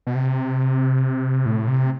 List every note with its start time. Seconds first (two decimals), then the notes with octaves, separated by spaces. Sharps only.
0.07 B2
0.15 C3
1.46 A2
1.67 C3